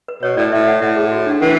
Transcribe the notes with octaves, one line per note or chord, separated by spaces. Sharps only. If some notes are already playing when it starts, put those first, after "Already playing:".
B4
B2 C#5
A2 D5
A2 E5
E5
F#5
A2 E5
G#4
F#4
D4
E3 C#4